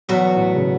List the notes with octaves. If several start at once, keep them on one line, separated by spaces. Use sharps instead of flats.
E2 B2 F#3 B3 F#4
A2
C#3